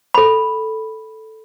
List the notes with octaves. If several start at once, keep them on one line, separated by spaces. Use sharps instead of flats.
A4 B5